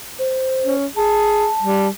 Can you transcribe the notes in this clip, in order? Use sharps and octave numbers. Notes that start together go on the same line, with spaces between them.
C5
C#4
G#4 A5
G3